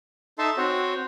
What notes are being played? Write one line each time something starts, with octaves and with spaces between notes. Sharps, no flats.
D#4 A4 E5 A5 C6
C4 F#4 C5 C#5